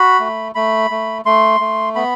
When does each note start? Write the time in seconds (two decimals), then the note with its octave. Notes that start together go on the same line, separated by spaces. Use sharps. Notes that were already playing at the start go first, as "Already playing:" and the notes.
Already playing: F#4 B5
0.20 A3
0.55 A3 B5
0.91 A3
1.25 A3 C6
1.60 A3
1.95 B3 B5